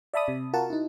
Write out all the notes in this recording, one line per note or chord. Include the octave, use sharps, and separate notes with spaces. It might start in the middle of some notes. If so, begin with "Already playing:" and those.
D5 E5 A5 B5 D#6
C3
F4 F#4 A#4 F#5 A5
D#4 E4